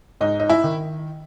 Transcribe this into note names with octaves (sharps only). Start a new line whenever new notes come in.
G#2 D#4
D#4
E4
D#3